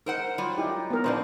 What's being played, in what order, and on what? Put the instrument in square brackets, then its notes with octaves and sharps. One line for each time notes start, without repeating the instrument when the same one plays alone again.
[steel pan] D#4 [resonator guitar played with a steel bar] A#4 C5 F#5
[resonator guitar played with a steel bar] F#3 G3 F4
[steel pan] D#4 E4 G4
B3 A#4
[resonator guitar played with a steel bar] A#2 F3 C4 [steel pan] D4 C5